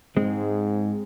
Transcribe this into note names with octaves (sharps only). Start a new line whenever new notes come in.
G#2 G#3 C4